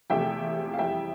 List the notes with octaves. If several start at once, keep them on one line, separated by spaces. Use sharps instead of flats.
E2 C3 F3 A3 E5 G5
F5
F2 E3 G3 E5 G5